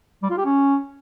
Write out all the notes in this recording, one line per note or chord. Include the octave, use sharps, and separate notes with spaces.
G3
F4
G4
C#4